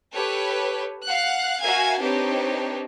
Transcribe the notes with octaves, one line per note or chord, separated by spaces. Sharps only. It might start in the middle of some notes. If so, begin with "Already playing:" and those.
G4 A4 B4 C#5
F5 F#5 F#6
F#4 A#4 E5 F5 G#5 G#6
C4 D4 D#4 G4 B4 C#5